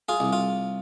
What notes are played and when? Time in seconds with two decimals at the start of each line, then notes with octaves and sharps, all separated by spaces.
0.09 F4 G#4
0.20 C2
0.33 F4